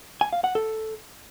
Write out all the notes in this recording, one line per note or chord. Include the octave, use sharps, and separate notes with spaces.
G#5
F5
F#5
A4